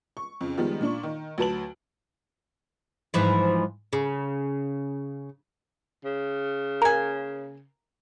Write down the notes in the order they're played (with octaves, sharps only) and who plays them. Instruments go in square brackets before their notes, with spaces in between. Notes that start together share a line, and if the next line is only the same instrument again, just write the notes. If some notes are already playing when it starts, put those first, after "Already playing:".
[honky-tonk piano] C#6
F2 C#3
D#3 F3 G3 G#3 B3
A#2 D4 C#6
D#3
D2 F#3 B4 A5 D7 F#7
[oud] G#2 E3 F3
C#3
[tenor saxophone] C#3
[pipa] A#3 G#5 [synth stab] A#4